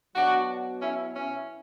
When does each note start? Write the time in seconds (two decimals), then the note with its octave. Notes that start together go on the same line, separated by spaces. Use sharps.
0.16 B2 F#3 D4 F#4
0.82 C#4 E4
1.15 C#4 E4